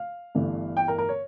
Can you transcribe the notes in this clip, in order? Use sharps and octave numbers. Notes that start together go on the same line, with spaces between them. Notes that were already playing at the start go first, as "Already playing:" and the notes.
Already playing: F5
G1 G2 E3 A3
G5
A#4
A#4
C#5